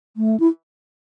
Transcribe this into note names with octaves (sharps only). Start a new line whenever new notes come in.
A3
E4